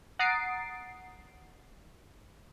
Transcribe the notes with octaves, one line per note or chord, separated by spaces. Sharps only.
F#5 A#5 D#6 A6 C7 D7